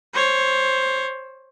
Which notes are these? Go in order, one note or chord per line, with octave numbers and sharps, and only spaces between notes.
C5 C#5